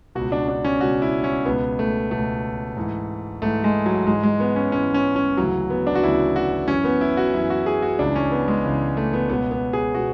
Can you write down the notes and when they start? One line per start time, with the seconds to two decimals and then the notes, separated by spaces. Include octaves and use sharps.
0.15 C#2 B2 F#4
0.32 D4
0.48 D4
0.64 C#4
0.81 C#2 B2 F#4
1.02 E4
1.24 C#4
1.45 C#2 B2 B3
1.79 A3
2.11 C#2 B2 A3
2.77 G#2 E3
3.42 G#2 E3 A3
3.64 G#3
3.86 F#3
4.07 G#2 E3 G#3
4.23 G#3
4.40 B3
4.56 C#4
4.72 G#2 E3 C#4
4.94 C#4
5.16 C#4
5.37 D2 C#3 E3 F#3
5.70 B3
5.87 D4
5.95 F#4
6.03 D2 C#3 E3 E4
6.36 F#4
6.68 F#2 E3 C#4
6.84 B3
7.01 E4
7.17 F#4
7.34 F#2 E3 E4
7.50 F#4
7.66 G#4
7.82 F#4
7.99 C#2 C#3 E3 D4
8.15 C#4
8.32 B3
8.48 G#3
8.64 C#2 C#3 E3
8.97 A3
9.13 B3
9.29 C#2 B2 B3
9.51 B3
9.73 G#4
9.95 B2 F#4